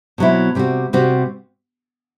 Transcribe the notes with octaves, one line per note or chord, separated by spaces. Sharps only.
B2 F#3 C4 E4
C3 G3 C4 F#4
C3 G3 C4 F#4